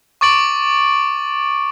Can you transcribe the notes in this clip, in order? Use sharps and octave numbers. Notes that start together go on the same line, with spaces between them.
C#6 D6 A6 D7 F#7